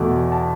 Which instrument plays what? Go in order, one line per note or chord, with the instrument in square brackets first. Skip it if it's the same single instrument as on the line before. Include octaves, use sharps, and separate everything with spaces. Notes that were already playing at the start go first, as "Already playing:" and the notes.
Already playing: [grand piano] E2 B2 A3
A5